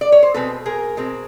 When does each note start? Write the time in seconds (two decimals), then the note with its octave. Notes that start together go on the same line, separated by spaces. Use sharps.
0.01 D5
0.12 C#5
0.23 C5
0.34 B2 G#3 C4 A4 B4
0.66 G#4 A#4
0.97 B2 G#3 C4